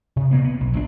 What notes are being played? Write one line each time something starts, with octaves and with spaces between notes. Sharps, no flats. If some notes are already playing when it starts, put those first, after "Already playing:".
C3
B2 A#3 B3
B3
B1
A#1 D#3 D4